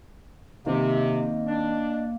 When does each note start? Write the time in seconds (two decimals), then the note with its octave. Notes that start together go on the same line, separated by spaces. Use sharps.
0.66 C3 D#3 A#3 C4 D#5
1.47 D4